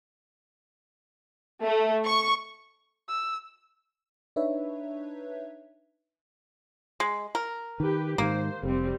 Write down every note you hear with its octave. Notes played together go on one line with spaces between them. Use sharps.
A3
C#6
E6
D4 D#4 B4 C#5 E5
G#3
A#4
D#3 G4 B4
G#2 D3 D#3 A#3 C5
F1 G3 C4